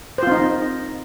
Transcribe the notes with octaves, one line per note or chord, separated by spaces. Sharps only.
C4 D#4 F4 C5